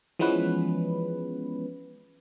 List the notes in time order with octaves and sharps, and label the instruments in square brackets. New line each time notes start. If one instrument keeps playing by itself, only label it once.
[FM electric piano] E3 F3 G#3 B3 C#4 B4